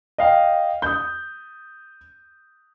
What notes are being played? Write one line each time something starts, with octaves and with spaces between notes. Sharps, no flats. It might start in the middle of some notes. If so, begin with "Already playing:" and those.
D#5 F5 G5
D#6 G6